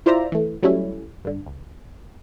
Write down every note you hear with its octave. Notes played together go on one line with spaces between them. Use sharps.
E4 F4 C5 D5 E5 A#5
E3 A3
F#3 G3 A3 C#4 E4
G2 D3
C#2